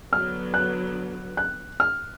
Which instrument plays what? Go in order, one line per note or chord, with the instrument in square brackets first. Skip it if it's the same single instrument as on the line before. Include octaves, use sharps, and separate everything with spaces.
[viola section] D3 F#3 B3 [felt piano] F6
[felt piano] F#6
F#6
F6